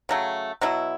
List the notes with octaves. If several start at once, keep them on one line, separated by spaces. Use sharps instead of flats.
C#3 F#3 A3
B2 F#3 B3 E4